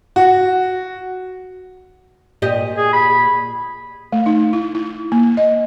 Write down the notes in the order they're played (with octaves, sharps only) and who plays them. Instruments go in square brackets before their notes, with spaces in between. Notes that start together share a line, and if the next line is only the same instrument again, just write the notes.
[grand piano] F#4
[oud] A#2 G4 D#5
[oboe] G#4
B5
[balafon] A3
D#4
E4
E4
A#3
D#5